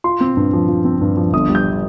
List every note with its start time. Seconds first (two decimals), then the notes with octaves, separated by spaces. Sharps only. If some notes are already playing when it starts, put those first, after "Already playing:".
0.04 F4 C6
0.21 C4
0.37 G2
0.53 F3
0.68 F4
0.85 C4
1.01 G2
1.17 F3
1.33 G1 D#6
1.49 G3
1.55 G6